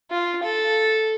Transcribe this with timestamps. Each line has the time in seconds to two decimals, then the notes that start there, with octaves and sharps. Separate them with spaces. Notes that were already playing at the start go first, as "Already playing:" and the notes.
0.11 F4
0.43 A4